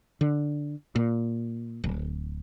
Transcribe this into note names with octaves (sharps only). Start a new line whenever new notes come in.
D3
A#2
D1